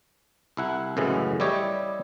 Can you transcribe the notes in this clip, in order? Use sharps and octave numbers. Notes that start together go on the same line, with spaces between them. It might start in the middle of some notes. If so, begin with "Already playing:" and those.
C2 E4 F#5
F#2 A2 C#3 E3 G#3 B3
G3 E4 G4 C#5 D#5